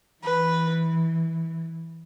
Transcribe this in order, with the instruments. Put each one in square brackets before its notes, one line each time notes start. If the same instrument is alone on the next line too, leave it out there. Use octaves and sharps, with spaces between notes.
[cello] E3 [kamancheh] B4